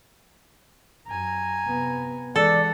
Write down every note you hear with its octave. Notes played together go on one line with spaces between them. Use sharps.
F#2 G#5 A#5
C3 B3
E3 G#3 A4 D5 F#5